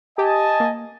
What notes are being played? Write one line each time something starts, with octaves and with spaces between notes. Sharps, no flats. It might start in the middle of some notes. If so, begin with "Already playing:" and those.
G4 D#5 G#5 A5
A#3